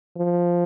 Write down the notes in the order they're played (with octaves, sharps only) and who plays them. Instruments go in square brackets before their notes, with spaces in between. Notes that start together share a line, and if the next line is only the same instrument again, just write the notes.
[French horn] F3